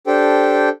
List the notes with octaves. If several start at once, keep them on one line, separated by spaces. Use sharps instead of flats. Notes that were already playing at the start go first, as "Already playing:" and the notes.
D4 G4 A4 C5 G5